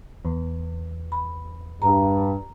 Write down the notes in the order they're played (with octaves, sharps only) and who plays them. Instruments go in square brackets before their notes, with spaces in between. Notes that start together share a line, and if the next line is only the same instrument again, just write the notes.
[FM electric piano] E2
[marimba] B5
[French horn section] G2 [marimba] A#5